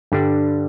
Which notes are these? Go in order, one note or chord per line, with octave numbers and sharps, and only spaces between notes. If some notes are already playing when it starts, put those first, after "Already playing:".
G2 D3 G3 D4